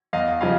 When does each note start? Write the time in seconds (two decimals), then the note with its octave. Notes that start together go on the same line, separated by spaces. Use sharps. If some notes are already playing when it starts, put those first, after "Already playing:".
0.13 E2 D#5 F5
0.41 C#3 F3 D#5 F5